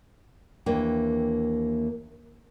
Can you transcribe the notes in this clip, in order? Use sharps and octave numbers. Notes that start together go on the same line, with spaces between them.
D#2 E3 A#3 D4 G5